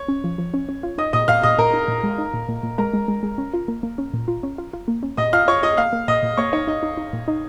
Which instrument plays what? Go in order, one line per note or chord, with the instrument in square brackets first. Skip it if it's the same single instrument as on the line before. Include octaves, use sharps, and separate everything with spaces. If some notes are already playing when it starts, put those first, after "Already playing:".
Already playing: [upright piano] C#5
[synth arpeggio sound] C#4
F3
F3
C#4
C#4
F4
[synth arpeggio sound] D#4 [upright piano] D#5 D#6
[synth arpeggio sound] A#2 [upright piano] D#5 D#6
[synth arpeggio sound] A#2 [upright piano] F5 F6
[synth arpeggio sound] A#2 [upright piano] D#5 D#6
[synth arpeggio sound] A#2 [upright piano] A#4 A#5
[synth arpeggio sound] D#4
A#2
G#3
D#4
A#2
A#2
A#2
[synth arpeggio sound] G#3 [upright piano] A#4 A#5
[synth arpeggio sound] G#3
G#3
G#3
C#4
F4
A#3
A#3
C#4
A#2
F4
C#4
F4
F4
A#3
C#4
[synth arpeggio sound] A#2 [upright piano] D#5 D#6
[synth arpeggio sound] F4 [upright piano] F5 F6
[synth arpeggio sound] F4 [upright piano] C#5 C#6
[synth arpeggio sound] F4 [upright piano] D#5 D#6
[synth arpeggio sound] A#3 [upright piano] F5 F6
[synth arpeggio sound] A#3
[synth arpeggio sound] A#2 [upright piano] D#5 D#6
[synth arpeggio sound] A#2
[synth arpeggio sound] A#3 [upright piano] C#5 C#6
[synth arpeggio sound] D#4 [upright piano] C#5
[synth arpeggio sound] D#4 [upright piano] D#5
[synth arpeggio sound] D#4
D#4
A#2
D#4